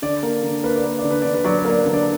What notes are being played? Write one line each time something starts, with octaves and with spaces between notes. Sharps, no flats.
D3 D5
A#3
D3
A#3 B4
D5
A#3 B4
D5
D3
B4
D3 D5
B4
F#3 D5
B4
A#3 D5
D3 B4
D5